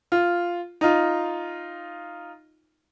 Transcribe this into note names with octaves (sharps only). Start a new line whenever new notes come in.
F4
D#4 F4